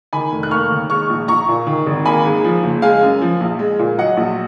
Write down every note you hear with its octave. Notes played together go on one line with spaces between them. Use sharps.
D#3 G#5 B5
F1
F#6
A#3 C#6 F6
D#2
G#3 C#6 F6
A#1
A#1 A#5 C#6
A#2
D#3
G#1
A#3 G#5 B5
G#2
F3
F#1
G#3 F5 G#5
F#2
F3
A#1
G#3
A#2
F#3 D#5 F#5
A#1